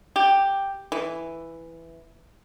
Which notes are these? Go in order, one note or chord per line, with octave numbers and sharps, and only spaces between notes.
G4
E3